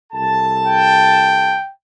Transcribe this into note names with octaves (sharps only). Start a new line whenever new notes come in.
C2 A4 A5
G5